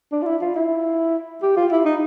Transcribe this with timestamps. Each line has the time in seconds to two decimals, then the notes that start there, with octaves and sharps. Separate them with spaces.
0.12 D4
0.22 F4
0.26 E4
0.42 F4
0.56 E4
1.42 G4
1.57 F4
1.72 E4
1.86 D#4